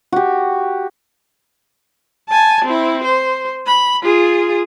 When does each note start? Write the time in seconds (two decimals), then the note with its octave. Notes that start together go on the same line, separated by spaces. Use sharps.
0.12 F#4 G4
2.29 G#5 A5
2.65 C4 E4
3.04 C5
3.67 B5
4.02 F4 G#4